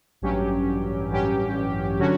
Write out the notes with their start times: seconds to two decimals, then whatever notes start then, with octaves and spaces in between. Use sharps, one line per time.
0.22 A1 G2 F#3 C#4 G4
1.10 A1 G2 F#3 C#4 G4
1.99 D3 F#3 C#4 F#4